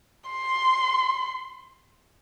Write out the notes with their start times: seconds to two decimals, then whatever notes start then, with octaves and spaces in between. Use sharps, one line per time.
0.30 C6